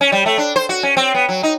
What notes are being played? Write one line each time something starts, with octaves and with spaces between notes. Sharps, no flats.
C#4
G3
A3
D4
C5
F#4
C#4
C4
B3
F#3
D#4